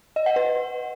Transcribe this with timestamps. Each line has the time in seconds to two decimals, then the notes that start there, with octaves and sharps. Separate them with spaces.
0.16 D#5
0.26 F#5
0.36 B4